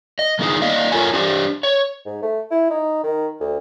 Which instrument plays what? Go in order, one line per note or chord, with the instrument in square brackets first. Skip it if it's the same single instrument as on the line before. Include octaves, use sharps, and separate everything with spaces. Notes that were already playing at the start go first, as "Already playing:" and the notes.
[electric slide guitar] D#5
D#3 B3 D#4 G#4
A#3 D5 D#5 F5
C4 F4 A4 A#4 C#5 G#5
D4 G4 C5
C#5
[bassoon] G#2
A3
E4
D#4
D#3
D2